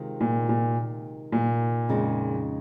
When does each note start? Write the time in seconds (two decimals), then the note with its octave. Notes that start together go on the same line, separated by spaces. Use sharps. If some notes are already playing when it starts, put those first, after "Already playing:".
Already playing: C3 D#3 G#3 C4 F4
0.21 A#2
0.49 A#2
1.32 A#2
1.89 F2 C#3 G#3 D#4